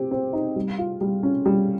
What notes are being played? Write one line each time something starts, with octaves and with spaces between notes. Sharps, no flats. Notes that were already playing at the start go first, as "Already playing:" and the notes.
Already playing: C4 G4
C4
D#4
G3
F4
G3
C#4
G3